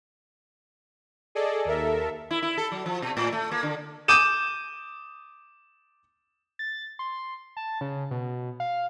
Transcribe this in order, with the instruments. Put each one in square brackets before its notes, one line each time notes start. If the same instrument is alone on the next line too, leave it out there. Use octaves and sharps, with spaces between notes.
[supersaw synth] G#4 A4 D5 D#5
D#2 A4 A#4 E5
[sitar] E4
E4
A4
F#3
F3
B2
A2
A3
A#3
D3
[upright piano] D6 D#6 G6 D#7 E7
[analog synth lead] A6
C6
A5
C#3
B2
F5